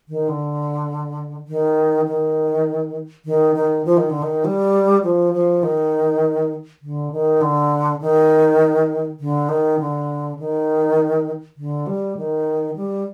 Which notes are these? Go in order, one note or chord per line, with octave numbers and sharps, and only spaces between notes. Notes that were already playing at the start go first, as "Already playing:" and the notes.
D#3
D3
D#3
D#3
D#3
D#3
F3
D#3
D3
D#3
G3
F3
F3
D#3
D3
D#3
D3
D#3
D3
D#3
D3
D#3
D3
G3
D#3
G3